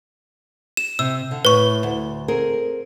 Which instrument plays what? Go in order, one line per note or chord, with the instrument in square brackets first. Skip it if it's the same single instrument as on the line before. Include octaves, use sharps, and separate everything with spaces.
[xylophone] E7
[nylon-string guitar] C3 [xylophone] E6
[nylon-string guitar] D3
[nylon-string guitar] A2 [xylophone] B4 C#6
[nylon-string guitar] D2
C4 G#4 A#4